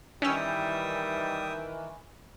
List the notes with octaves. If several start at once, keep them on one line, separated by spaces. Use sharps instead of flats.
D#3 E3 G3 C#4 E5 G5 D#6 E6